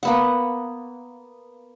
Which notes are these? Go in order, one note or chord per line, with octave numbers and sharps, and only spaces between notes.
A#3 B3 F#5